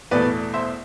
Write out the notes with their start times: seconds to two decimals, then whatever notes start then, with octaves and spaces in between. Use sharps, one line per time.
0.11 E2 B2 A3 B4 D5
0.54 C5 E5